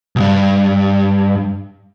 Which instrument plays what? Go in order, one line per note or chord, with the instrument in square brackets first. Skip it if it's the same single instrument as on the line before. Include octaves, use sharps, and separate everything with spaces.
[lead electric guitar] B1 G2